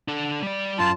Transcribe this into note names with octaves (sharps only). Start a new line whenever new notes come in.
D4 A4
G3 D5
F#2 F4 A5